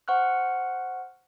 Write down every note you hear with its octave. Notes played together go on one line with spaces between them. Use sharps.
C5 F#5 C#6 F6 F#6